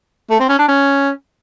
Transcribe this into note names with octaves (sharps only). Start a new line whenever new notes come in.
A3
C4
C#4
D4
C#4